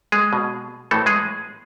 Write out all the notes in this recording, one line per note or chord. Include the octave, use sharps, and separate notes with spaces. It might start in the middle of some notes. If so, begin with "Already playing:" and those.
G#3 G#4
B2
A2 E3 A3 A4
G#3 G#4